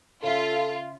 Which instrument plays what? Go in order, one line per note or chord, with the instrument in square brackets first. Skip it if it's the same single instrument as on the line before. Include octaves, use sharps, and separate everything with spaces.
[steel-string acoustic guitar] C#3 E5 [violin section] F4 [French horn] A4